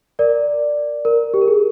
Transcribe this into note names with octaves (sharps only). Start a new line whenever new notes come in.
A#4 D5
A#4
G4
A#4
G#4